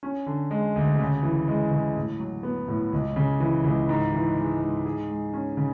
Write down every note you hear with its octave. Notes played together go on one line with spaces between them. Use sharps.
C#4
D3
G#3
D2
C#3
E3
G#3
C#3
A2
F#3
B3
A2
C#2
C#3
E3
C#2
G#2
E3
G#3
G#2
G#4
G#3
C#4
C#3